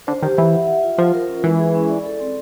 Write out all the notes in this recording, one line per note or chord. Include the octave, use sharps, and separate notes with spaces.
D3 C5
D#3 G4
E3 E5
F#5
F#5
F4
F3 F4
A#4
C#4
E3 G#3
G#4
C#4
D5
A4
C4